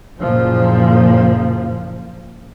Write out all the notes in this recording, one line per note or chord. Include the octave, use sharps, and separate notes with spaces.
F#1 A#2 F3